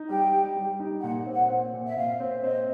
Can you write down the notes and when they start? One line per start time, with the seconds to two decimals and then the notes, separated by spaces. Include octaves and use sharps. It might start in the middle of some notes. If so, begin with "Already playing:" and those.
Already playing: D#4
0.09 G3 G5
0.32 G3
0.56 G3
0.80 D#4
1.02 A#2 F#5
1.26 C4
1.34 F#5
1.50 C4
1.73 A#2
1.87 E5
1.97 A#2 F5
2.20 C4
2.44 C4 D#5